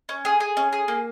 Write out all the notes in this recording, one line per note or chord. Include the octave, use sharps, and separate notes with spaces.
C#4
G#4
G#4
C#4
G#4
A#3